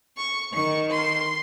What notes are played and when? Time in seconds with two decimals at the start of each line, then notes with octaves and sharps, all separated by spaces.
0.17 C#6
0.53 D#3 C#6
0.90 C6